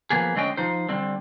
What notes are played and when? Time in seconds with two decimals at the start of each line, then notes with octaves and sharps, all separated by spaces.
0.10 F3 A#3 B3 G#4
0.35 D3 G#3 C4 C#4 D#5 G5
0.57 F3 D#4 C5
0.89 D3 G3 C4